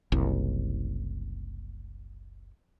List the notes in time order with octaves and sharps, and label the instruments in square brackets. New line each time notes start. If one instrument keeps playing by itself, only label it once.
[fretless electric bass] F#1 C2